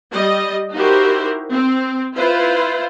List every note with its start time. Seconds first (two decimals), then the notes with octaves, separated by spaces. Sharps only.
0.12 G3 D#5
0.74 D#4 E4 F#4 G4 A#4 C5
1.52 C4
2.15 E4 F4 B4 C5